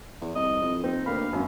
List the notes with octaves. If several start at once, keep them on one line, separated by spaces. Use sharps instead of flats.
E2
C2 D#5
F2
C4 D#4
D2 A#3 F5 B5
G#1 F#2